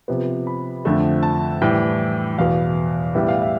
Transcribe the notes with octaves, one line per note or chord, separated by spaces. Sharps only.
C3 F3 B3
B5
F2 D3 F3 A3
A5
A2 E3 G3 G5
E2 B2 B3 F5
A2 G3 B3 E5
F5
E5